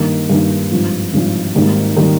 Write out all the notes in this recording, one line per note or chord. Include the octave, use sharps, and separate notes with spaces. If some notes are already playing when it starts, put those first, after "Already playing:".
Already playing: G2 D#3 A#3 D#4
G2 D#3 A#3 D#4
G#1 G2 F3
G#1 G2 F3
G#1 G#2 D#3 G3 A#3
D#3 G3 A#3